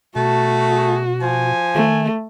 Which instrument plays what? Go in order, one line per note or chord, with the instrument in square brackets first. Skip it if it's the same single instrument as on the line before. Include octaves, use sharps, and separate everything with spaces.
[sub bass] B2 [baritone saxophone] A3 [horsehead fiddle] F#4 [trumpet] A5
[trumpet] G#4
[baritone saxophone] F3 [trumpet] G#5
[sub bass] D#3 [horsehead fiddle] A3